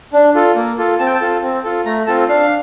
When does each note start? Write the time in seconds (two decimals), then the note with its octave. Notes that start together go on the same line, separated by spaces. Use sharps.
0.13 D4
0.35 F4 A4
0.56 A#3
0.78 F4 A4
0.99 C4 A5
1.06 G5
1.14 A5
1.21 F4 A4
1.42 C4
1.64 F4 A4
1.85 A3 A#5
2.07 C4 F4 A4 A5
2.28 D4 F5